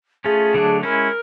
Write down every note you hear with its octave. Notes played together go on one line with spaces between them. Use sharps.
A3 C#4 F4 G#4
D3 F#3 A3 D4
G#3 C#4 E4 A#4